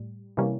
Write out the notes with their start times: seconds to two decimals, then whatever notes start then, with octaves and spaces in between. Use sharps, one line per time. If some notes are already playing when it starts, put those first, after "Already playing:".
Already playing: A2 G3
0.37 C3 E3 G3 A#3 C#4